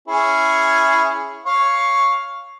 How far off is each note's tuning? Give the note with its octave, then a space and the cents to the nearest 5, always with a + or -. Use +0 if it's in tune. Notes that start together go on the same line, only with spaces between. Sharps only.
C#4 +0 E4 +0 G#4 +0
C#5 +0 F5 +0